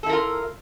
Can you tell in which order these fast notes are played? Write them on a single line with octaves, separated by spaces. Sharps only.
A4 E4 A#4 F4